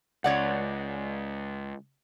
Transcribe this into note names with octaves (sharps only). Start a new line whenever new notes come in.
C#2 C#5 D5 F#5